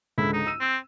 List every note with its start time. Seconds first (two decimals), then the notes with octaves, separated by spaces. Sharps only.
0.18 C#2 G#2 D3 E4
0.34 D#4
0.47 E6 D#7
0.61 C4